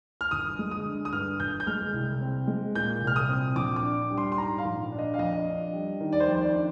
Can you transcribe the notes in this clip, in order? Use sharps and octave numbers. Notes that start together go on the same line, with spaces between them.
F6
G1 D#6
G#3
D#6
D3
D#6
G2 F6
G1 G6
G6
G#3 F6
C2
C4
G#3
A#2 G6
C2
F6
D#6
C4
A#1 D6
D6
D4
G3
C6
C6
G#2 A#5
F5
A#1
D4
D#5
F5
F2 D#5
D4
G3
D#3
D5
C5
F2
C5
D5
D4